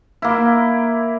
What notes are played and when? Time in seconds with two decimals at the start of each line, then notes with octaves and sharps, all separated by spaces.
0.22 A#3 E4